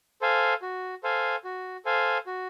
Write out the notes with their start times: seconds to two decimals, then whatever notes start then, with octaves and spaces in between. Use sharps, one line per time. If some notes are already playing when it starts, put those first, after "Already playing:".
0.21 A4 C5 F5 G#5
0.62 F#4
1.03 A4 C5 F5 G#5
1.44 F#4
1.85 A4 C5 F5 G#5
2.26 F#4